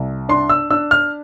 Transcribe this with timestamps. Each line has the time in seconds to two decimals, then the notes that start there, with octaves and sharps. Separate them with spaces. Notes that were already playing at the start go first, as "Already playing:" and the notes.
Already playing: C2
0.29 D4 C6
0.49 E6
0.70 D4 E6
0.91 F6